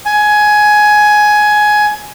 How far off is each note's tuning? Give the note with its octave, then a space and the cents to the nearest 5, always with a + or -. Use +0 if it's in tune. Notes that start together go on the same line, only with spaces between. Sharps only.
G#5 +15